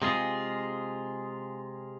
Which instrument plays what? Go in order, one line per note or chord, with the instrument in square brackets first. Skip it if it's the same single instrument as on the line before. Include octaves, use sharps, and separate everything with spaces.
[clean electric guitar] C3 G#3 F4 G#4